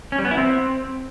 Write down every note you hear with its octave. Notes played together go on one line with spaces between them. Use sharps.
C#4
G3
B3
E4
C4